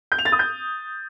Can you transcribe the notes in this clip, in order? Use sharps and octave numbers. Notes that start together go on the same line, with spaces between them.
G6
F7
A6
D#6
G6